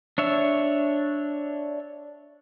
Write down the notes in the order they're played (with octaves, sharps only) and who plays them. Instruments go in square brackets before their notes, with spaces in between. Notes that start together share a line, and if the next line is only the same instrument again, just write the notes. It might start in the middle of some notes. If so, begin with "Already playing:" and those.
[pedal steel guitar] D4 C#5 E5